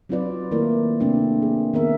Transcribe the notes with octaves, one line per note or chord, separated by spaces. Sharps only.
F#3 C4 D#4 F4 B4 D5
D#3 A3 A#3 E4 A#4 D5
C3 A3 A#3 C4 D4
G#4
D#3 B3 A#4 E5